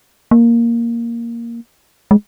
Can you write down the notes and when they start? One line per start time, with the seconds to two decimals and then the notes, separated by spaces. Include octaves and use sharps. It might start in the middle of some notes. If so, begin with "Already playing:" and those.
0.31 A#3
2.11 G#3